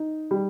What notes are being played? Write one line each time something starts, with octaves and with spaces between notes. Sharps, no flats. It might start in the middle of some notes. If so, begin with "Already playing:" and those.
Already playing: D#4
G3